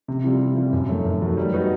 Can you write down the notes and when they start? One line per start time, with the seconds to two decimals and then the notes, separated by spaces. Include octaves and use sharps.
0.08 C3
0.24 E3 G3 C4 F4
0.40 C3
0.56 E3 G3 C4 F4
0.73 F#2
0.89 D#3 F#3 A3
1.05 F#2
1.22 D#3 F#3 A3
1.37 G3
1.53 B3 D#4 F#4